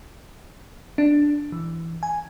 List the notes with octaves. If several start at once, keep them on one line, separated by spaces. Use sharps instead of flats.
D4
E3
G#5